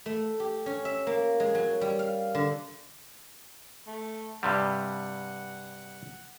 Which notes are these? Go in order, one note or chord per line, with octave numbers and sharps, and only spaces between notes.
A3
G4
C#4
E5
A#3
G#3
F#3
G3
F5
D3
A3
G2 C3 G3 F#5